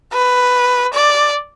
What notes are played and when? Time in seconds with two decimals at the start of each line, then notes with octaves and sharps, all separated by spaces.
0.13 B4
0.94 D5